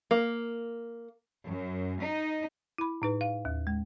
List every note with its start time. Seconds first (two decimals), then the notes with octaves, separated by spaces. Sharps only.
0.11 A#3
1.47 F#2
2.03 D#4
2.78 E4 B5
3.02 A2 D#4 B4
3.21 F5
3.45 D#2
3.67 G#3